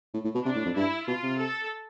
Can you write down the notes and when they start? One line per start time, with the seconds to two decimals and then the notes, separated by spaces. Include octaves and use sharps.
0.14 A2
0.24 A2
0.35 B2
0.45 C3 D4
0.55 A2
0.65 F2
0.76 G2 E4
1.07 B2 F4
1.23 C3
1.38 A4